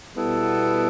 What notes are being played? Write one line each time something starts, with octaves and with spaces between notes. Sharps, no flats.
B2 G3 B3 E4 A4